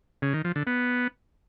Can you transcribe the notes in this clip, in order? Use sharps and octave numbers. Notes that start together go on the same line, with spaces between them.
C#3
D#3
F3
D3
B3